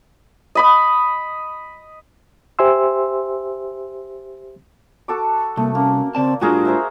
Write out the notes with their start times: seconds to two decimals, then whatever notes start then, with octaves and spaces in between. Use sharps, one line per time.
0.55 D#5 B5 D#6
2.59 G4 C5 E5 G#5 C6 E6
5.08 F#4 A4 D6
5.57 C2 A3 A#3
5.75 A#3 C#4
6.15 C#3 C4 D5 A5
6.41 A2 G3 D4 F4 F#4 G#4 A#4
6.65 A#4 C5 E5